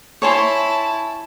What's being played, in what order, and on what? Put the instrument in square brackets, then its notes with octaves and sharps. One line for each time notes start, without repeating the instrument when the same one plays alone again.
[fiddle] E4 A5 [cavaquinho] C#5 G#5 C6